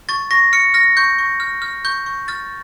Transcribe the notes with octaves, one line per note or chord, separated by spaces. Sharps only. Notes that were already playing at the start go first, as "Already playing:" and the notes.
C#6 A6
C#6 A#6
F6 C#7
F6 A#6
C#6 G6
C#6
F6
F6
C#6 G6
C#6
F6 A6